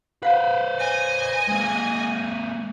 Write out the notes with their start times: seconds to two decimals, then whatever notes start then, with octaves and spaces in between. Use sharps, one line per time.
0.23 B4 C5 F5 F#5
0.79 D#5 G#5
1.48 G#3 A#3